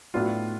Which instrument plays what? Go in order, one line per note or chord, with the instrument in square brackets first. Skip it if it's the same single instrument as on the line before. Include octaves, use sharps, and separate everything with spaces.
[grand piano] A2 F#3 B3 D4 F4